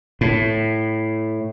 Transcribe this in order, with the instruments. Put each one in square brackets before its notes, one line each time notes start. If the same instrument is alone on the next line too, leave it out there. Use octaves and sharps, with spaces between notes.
[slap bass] A2